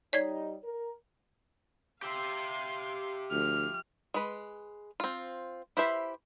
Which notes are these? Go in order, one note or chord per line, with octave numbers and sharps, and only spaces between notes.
G3 D#4 C#5 D5 G#6
A#4
G4 E5 F5 C6
D2 F3 F6
G#3 B4
C4 F4
E4 G4 B4 C5 E5